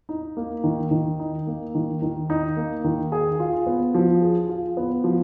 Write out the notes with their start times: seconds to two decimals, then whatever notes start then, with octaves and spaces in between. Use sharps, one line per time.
0.09 D#4
0.37 A#3
0.64 D#3
0.91 D#3
1.20 D#4
1.47 A#3
1.75 D#3
2.02 D#3
2.30 D#4
2.57 A#3
2.84 D#3
3.12 G#4
3.40 F4
3.66 B3
3.94 F3
4.21 G#4
4.49 F4
4.77 B3
5.04 F3